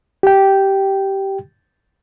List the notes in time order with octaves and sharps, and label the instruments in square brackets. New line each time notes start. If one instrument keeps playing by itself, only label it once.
[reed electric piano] G4 G5